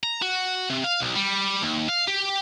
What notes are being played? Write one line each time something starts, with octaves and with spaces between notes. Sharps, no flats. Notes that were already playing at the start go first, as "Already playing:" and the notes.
A#5
F#4
C3
F5
B1
G3
D#2
F5
G4